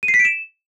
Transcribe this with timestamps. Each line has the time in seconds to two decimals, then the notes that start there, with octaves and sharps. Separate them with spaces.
0.03 D#7
0.08 C7
0.14 B6
0.19 D7
0.25 E7